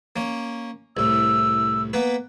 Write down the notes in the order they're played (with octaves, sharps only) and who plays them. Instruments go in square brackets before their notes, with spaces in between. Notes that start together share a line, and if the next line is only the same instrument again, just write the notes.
[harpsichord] A#3 C#4
[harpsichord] C2 A2 [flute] E6
[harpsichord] A#3 B3 B4